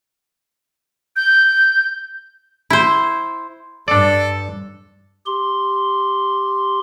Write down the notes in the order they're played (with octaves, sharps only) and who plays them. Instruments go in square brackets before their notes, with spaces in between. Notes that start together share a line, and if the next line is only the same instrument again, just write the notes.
[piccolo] G6
[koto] E4 C5
[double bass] G2 [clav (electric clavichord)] D4 D5 [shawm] A4
[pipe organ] G4 C6